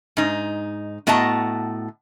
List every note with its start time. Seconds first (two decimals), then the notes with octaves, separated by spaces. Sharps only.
0.17 G#2 D#4
1.07 A2 B3 F#4 D#5 A5 A#5